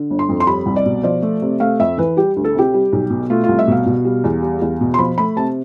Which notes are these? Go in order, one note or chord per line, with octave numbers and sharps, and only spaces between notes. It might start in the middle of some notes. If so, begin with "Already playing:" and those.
Already playing: D3
G1
C6
F2
C6
G3 B5
C2
D5
B2
F3 D5
A3
C3
A3 F5
F2 E5
E3 B4
G3 G4
D2
A4
C3 G4
G3
B1
B2
A3 F4
F4
C2
E5
B2 F5
B2
G3
E2
G3
E2
B2
C6
F3 B5
A3 B5
C3 A5